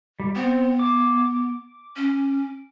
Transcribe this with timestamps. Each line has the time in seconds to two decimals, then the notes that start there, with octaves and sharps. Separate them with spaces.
0.20 G3
0.36 B3 C4
0.79 D6
1.96 C#4